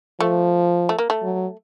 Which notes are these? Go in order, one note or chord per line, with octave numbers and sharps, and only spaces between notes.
F3 A3
A3
A#3
A3
F#3